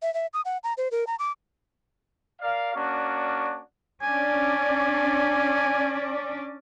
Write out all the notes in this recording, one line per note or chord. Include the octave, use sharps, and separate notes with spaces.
E5
E5
D#6
F#5
A#5
C5
A#4
A#5
D6
A#4 D5 F5
A#3 C#4 D4 F#4 D5
C#4 D4 D5 G#5